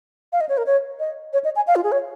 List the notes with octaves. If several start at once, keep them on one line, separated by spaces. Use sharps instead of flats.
F5
D#5
C#5
A#4
C#5
D#5
C#5
D#5
G#5
F5
F4
G#4
C#5